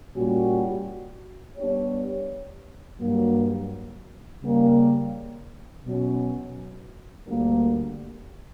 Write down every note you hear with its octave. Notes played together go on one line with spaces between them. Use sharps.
A#2 G3 C#4 F#4
G3 B3 D4 G4 C#5
G2 F#3 A#3
C#3 G3 A#3
B2 F#3 C#4
D2 D3 G3 A#3